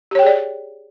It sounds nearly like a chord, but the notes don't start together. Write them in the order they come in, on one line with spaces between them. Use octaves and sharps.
G4 C#5 G5 G#4 D5